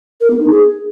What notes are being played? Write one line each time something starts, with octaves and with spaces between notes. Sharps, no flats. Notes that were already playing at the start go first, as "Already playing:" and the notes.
A#4
B3
D#4
G#4